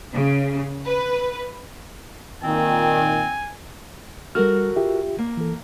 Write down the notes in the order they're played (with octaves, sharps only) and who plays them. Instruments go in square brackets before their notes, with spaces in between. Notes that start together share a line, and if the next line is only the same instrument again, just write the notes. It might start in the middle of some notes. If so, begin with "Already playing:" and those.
[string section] C#3
B4
[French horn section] A#2 D#3 [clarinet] C4 [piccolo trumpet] G#5
[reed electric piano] G3 F6 [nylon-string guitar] F#4 A4 A#4
[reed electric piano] F4 G4 E5
[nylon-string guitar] A#3
[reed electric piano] E3 A4